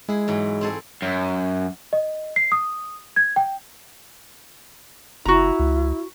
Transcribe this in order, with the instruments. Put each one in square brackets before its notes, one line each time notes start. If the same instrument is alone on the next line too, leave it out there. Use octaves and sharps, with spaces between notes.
[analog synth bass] G#3 [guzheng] E4 G#4
[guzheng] G#2 E3 F#3
C4 G#4 A4
[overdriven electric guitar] F#2
[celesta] D#5
C7
D#6
G#6
G5
[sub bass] F#1 [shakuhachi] E4 [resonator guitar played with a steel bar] F#4 A#5
[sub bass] C#2